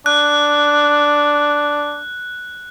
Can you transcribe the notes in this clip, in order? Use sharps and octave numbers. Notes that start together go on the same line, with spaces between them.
D4 F#6